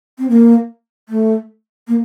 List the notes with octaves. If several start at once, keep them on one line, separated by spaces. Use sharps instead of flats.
C4
A#3
A3
A#3